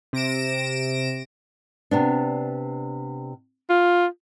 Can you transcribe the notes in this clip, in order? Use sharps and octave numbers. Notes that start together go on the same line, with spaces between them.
C3 A#6 D7 E7
C3 B3 D4
F4